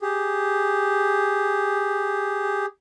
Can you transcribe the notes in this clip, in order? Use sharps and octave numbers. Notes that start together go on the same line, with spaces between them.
G4 G#4